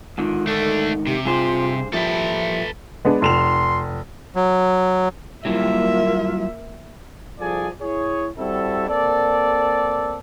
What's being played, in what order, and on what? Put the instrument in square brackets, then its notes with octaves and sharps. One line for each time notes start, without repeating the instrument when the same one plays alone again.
[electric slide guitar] G#2 D3 D#3 [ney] F4
[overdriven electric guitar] A3 D4 [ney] A4
[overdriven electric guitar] C3 [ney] G4
[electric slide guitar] G2 G#4 C5 [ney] F4
[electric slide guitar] A#2 F3 G3 [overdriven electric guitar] A4 B4 [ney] E5
[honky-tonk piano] G#3 B3 D4
[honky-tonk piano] F1 E7 F7 [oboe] C6
[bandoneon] F#3
[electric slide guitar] F#3 G3 E4 [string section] A#3 [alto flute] F4 [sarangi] E5
[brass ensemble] C2 F3 G#4 A4 D5 G#5
E4 G#4 C#5
G3 C4 E4 F#4 A4
A#3 C4 A4 D5